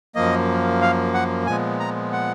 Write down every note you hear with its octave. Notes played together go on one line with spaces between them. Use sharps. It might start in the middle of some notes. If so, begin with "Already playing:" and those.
F#2 F3 A#3 D#5
F5
F#5
A#2 F3 G#3 B3 G#5
A#5
F#5